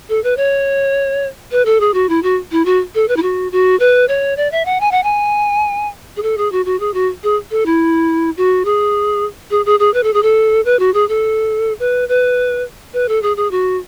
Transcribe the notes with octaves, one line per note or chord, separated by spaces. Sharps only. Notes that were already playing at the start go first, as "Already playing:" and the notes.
A4
B4
C#5
B4
A4
G#4
F#4
E4
F#4
E4
F#4
A4
B4
E4
F#4
F#4
B4
C#5
D5
E5
F#5
G#5
F#5
G#5
G#4
A4
G#4
F#4
F#4
G#4
F#4
G#4
A4
E4
F#4
G#4
G#4
G#4
G#4
B4
A4
G#4
A4
B4
F#4
G#4
A4
B4
B4
B4
A4
G#4
G#4
F#4